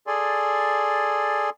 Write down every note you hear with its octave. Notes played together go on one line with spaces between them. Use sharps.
G#4 A4 D5 G#5 C6